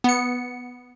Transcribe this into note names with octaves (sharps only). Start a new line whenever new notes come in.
B3 C#7